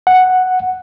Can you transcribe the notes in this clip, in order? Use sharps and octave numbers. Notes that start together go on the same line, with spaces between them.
F#5